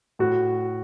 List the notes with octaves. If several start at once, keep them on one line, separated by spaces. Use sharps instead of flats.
A2 F#4